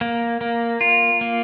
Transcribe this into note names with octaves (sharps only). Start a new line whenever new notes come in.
A#3
A#3
F4
A#3